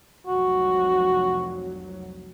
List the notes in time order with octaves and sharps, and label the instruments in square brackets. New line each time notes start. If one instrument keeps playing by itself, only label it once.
[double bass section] F1 C2 F#3 [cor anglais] F#4